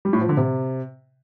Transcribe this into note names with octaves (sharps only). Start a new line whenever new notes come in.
G3
A2
F3
D3
C3